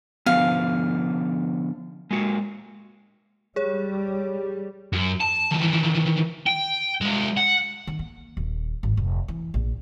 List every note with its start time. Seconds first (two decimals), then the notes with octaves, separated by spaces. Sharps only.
0.26 D3 F3 B3 F5
2.11 G#3 A#3 F#4
3.56 G3 G#4 C#5
4.93 F#2
5.21 A5
5.52 D#3 E3
6.47 G5
7.01 G#3 B3
7.37 F#5
7.87 D#3
7.99 A#3
8.37 D#1
8.83 G#1
8.97 F1
9.28 E3
9.54 A#1